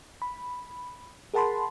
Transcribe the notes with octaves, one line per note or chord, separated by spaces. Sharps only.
B5
G#4 A#4 F#5 A5 B5 C6